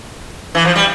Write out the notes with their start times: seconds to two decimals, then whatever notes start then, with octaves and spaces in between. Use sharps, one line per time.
0.55 E3
0.65 F3
0.76 G3